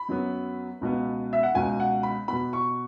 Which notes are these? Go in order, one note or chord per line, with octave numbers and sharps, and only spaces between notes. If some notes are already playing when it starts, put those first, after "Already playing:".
Already playing: B5
F#2 F#3 B3
C#2 B2 B3
E5
F#5
C#2 B2 B3 G#5
F#5
B5
B2 B3 B5
C#6